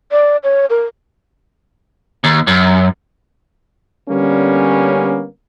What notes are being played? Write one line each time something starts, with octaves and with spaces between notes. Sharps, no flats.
D5
C#5
A#4
D#2
F#2
D3 G3 A#3 B3 C#4